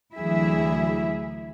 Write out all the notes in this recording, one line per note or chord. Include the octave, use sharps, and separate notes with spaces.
D2 E3 F#3 E4 G#4 E5